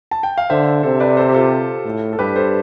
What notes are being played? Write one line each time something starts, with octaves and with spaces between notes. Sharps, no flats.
A5
G5
F5
D3 C5 E5
C3 A4 C5
B4 D5
A4 C5
G4
F4 A4
A2
A4
G2 G4 B4
A4 C5